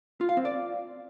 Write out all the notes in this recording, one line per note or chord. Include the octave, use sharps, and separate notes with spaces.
F4
F5
C4
D5